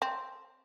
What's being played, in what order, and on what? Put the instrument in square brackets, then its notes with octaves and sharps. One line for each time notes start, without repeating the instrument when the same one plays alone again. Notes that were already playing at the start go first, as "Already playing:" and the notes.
[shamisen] C4